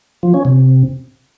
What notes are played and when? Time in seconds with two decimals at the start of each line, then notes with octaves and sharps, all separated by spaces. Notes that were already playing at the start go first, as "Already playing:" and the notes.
0.23 F3
0.34 C#4
0.45 C3